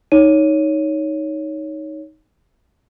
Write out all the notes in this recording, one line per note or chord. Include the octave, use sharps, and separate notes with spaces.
D#4 C#5 D#7